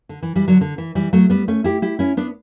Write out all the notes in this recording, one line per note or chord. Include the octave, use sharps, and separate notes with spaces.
D3
E3
E3 G3
D3 F#3
D3
E3
E3 G3
F#3 A3
G3 B3
A3 C#4
E4 G4
E4 G4
C#4 E4
B3 D4